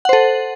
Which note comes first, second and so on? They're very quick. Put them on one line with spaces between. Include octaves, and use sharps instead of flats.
F#5 C5 A4